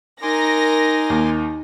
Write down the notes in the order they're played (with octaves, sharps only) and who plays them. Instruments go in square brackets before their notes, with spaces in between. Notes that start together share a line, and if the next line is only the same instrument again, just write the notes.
[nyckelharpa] D#4 [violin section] A#4 A#6 [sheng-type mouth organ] G#5 C6 D6
[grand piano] D#2